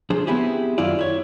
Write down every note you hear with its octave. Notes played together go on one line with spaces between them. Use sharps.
F3 D4 G#4 C5
B3 C4 E4 G4 G#4
F#2 D#3 E4 F4 D5
E4 C#5